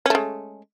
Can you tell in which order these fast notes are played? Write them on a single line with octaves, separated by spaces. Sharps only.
C#4 A3 G#3